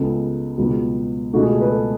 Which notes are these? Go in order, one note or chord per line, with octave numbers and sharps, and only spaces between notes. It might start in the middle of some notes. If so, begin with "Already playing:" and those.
Already playing: C#2 C#3 G#3 B3 A4
C#2 B2 F#3 B3
C#2 B2 A3 F#4
G#4
A4
B4
A4